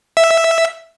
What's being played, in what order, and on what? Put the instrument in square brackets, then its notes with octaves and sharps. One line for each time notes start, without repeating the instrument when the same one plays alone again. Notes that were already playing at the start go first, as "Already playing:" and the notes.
[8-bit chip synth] E5